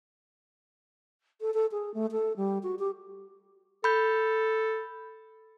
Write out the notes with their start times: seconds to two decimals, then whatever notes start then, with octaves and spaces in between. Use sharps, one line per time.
1.41 A4
1.54 A4
1.72 G#4
1.94 A3
2.12 A4
2.37 G3
2.63 F#4
2.79 G4
3.84 A4 B5 G6